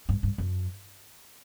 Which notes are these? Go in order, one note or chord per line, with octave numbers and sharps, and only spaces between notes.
G2
G2
F#2